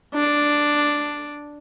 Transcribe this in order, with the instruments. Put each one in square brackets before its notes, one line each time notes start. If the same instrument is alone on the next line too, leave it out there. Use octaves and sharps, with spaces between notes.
[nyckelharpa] D4